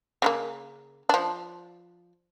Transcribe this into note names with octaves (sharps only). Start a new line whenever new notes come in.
C#3 F3 A#3
F3 D4